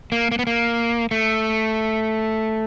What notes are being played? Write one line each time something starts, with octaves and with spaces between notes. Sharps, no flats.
A#3
A#3
B3
A#3
A3